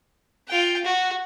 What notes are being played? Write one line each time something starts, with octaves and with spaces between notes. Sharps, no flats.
F4 G5
F#4